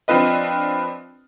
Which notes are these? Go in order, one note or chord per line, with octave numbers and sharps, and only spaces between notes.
F3 C4 D4 F4 B4 D#5